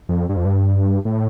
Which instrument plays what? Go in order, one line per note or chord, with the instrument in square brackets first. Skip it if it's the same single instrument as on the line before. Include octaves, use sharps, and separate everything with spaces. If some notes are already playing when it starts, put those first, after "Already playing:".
[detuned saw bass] F2
G2
F2
G2
A2